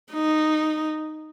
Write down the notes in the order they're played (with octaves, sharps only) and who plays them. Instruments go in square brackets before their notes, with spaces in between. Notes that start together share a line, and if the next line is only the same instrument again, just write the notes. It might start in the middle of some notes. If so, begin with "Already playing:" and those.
[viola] D#4